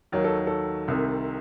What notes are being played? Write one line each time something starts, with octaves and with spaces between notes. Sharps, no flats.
D#2 D#3 F#3 A#4
A4
A4
C2 C3 D#3